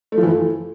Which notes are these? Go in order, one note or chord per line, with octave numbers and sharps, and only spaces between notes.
A3
F3
E3
A3